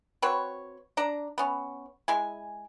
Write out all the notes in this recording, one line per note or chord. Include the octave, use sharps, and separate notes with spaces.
C4 F#4 B4 C#5
D4 A#5
B3 C#4
G#3 E4 G#5